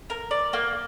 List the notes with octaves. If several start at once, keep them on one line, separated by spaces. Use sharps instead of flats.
A#4
D5
A#3